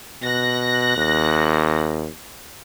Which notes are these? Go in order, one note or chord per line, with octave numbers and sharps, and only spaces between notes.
B2 F#6 A#6
D#2